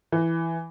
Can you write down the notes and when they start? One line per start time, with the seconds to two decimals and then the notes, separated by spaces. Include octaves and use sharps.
0.12 E3